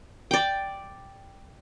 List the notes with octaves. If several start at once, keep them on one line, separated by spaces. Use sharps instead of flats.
D5 G5